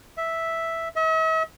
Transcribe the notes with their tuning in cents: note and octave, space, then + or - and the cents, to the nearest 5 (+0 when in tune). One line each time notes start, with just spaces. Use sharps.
E5 -5
E5 -45